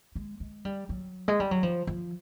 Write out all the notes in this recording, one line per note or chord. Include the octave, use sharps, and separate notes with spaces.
G#3
G#3
G3
F#3
G#3
G3
F#3
F3
F3